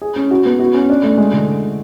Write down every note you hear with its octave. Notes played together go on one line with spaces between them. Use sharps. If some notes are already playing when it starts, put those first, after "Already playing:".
G#4
C#4
F#4
B3
F#4
C#4
D4
A3
G#3
D3